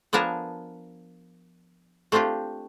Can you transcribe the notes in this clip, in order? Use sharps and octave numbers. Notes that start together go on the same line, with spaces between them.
F3 B3 D4 A#4 G#5 A5
A3 C4 D4 F4 G4